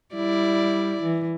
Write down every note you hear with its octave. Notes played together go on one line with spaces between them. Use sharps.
G3 E4 D5
E3